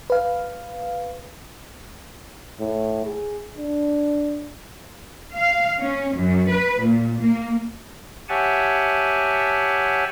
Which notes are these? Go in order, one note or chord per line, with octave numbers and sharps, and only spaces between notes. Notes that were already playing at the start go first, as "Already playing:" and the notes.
B4 F5
A2
G#4
D4
F5
C#4
F#2
B4
A#2
A#3
G4 C#5 E5 F#5 G#5 A5